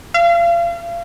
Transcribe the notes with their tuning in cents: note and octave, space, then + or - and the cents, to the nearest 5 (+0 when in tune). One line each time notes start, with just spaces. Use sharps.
F5 -35